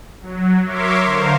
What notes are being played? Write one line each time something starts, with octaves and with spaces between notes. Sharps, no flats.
F#3
A#4 C#5 E5 C6 D6
D3 A#4 C5 F5